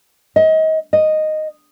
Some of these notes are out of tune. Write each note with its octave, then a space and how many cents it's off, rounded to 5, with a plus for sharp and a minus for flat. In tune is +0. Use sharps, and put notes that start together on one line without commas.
D#5 +30
D#5 -5